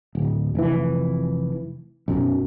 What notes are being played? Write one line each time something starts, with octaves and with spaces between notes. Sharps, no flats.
D1
F1 E3
B1 F#2